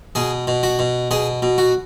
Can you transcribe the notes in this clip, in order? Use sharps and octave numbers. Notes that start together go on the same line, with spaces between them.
B2 G#4
B2
F#4
B2
B2 G#4
B2
F#4